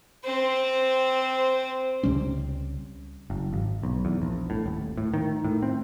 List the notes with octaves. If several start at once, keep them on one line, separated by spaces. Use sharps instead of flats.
C4 C5
C#2 C3 G3 C#4
F#1
G#1
B1
E2
A#1
A2
D#1
A2
D#3
A2
C4